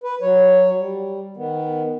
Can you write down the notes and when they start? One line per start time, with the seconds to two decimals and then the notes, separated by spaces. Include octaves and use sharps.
0.04 B4
0.22 F#3 C#5
0.79 G3
1.37 D#3 B3